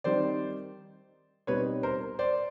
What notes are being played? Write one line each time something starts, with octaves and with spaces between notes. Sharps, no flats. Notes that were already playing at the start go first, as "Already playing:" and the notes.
D#3 G3 C4 D#4 C5 D5
B2 G3 C4 D#4 B4 C#5
A#4 C5
C5 D5